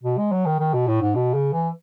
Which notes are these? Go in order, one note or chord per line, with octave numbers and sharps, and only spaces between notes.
B2
G#3
F#3
D#3
D#3
B2
A2
G#2
B2
C#3
E3